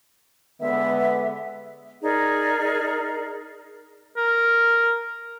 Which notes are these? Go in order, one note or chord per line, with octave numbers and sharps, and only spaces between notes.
D3 G#3 B3 E5
D#4 G#4 A#4 D5
A#4